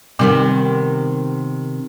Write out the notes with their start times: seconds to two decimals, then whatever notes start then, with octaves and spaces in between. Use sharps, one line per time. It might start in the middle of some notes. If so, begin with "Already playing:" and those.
0.19 C3 D#3 G3 B3 C4